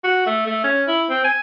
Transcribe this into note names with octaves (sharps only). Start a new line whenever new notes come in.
F#4
A3
A3
C#4
E4
C4
G#5